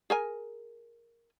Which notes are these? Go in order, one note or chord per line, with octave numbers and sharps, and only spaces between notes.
G#4 A#4 G#5